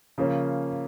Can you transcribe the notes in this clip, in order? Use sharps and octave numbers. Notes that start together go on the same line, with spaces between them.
C#3 F3 A#3 C#4